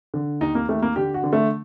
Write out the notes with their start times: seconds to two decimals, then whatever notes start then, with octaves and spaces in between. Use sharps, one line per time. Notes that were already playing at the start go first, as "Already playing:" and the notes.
0.14 D3
0.41 D#2 D#4
0.55 A#3
0.69 D#2 A3
0.82 A#3
0.96 D3 G4
1.14 F#4
1.24 D3
1.33 A3